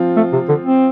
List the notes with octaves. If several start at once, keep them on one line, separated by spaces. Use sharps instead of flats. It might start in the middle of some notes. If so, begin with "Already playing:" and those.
Already playing: F3 C4 F4
A3
C3
D3
C4